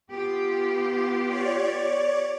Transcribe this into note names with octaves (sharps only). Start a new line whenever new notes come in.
B3 F4 G4
C#5 D5